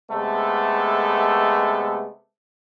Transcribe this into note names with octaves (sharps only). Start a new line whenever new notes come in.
C3 G#3 A3 B3 A4